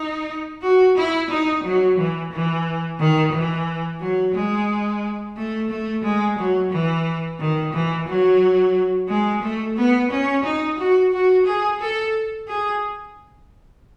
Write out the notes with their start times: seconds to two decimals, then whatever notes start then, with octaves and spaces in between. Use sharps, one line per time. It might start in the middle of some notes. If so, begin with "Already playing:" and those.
Already playing: D#4
0.62 F#4
0.97 E4
1.29 D#4
1.63 F#3
1.98 E3
2.32 E3
3.00 D#3
3.33 E3
4.00 F#3
4.35 G#3
5.36 A3
5.70 A3
6.03 G#3
6.38 F#3
6.71 E3
7.39 D#3
7.73 E3
8.07 F#3
9.09 G#3
9.42 A3
9.77 B3
10.11 C#4
10.44 D#4
10.78 F#4
11.12 F#4
11.45 G#4
11.80 A4
12.48 G#4